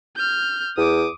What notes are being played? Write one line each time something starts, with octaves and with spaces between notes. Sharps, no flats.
F6 G6
E2 D6 D#6